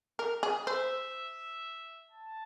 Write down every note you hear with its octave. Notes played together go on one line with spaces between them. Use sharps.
A#4
G#4
C5 E5
A5